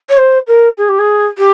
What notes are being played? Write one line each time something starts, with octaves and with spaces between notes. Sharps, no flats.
C#5
C5
A#4
G#4
G4
G#4
G4